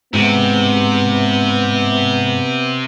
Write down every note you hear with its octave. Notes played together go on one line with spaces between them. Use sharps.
G#2 C3 B3